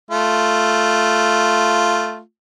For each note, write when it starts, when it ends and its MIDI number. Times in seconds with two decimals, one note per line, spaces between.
0.11 2.20 57
0.11 2.20 65